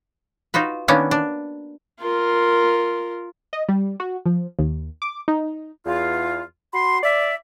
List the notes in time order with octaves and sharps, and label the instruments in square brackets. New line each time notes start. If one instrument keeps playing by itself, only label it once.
[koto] D#4 F4 F#4 B4
D#3 A#3 B3 C#4 D4
D4
[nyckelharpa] F4 A#4
[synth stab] D#5
G3
F#4
F3
D#2
D6
D#4
[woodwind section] E2 F4
F#4 B5 C6
D5 E5